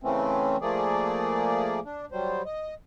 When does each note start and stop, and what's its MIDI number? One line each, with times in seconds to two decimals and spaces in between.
0.03 0.57 49
0.03 0.57 52
0.03 0.57 57
0.03 0.57 60
0.03 0.57 61
0.61 1.80 53
0.61 1.80 57
0.61 1.80 58
0.61 1.80 68
0.61 1.80 74
1.85 2.05 62
2.12 2.42 54
2.12 2.42 55
2.12 2.42 72
2.46 2.74 75